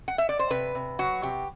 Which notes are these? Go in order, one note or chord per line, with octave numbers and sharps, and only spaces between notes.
F#5
E5
D5
C5
C3 B4
C3
F#3 F#4
C3 G4